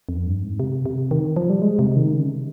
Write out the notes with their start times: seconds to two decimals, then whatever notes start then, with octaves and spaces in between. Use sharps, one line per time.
0.09 F2
0.26 G2
0.43 G#2
0.60 C3
0.86 C3
1.11 D#3
1.36 F3
1.50 G3
1.62 G#3
1.79 C3
1.96 D#3
2.13 C#3